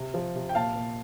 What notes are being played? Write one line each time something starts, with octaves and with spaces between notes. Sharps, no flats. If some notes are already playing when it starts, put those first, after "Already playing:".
Already playing: C3
F3
C3
G5
A#2 F5 A5
A#2